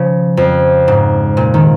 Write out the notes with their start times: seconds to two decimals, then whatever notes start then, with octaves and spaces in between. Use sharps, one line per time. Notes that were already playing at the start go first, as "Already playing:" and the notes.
Already playing: C#3 F3
0.37 F2
0.88 G#2
1.37 A#2
1.54 D#3